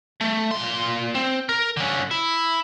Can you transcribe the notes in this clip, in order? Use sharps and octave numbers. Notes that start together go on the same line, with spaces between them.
A3
A#2 C6
C4
A#4
D3 C#4
E4